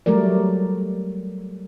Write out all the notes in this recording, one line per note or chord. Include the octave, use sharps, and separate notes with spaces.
F#3 G3 A3 A#4 D5